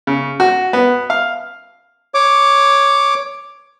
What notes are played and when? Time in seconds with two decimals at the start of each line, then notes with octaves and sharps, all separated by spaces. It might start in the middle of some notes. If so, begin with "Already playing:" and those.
0.07 C#3
0.40 F#4
0.73 B3
1.10 F5
2.14 C#5 D6